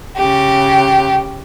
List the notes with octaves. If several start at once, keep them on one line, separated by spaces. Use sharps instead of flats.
C#3 G4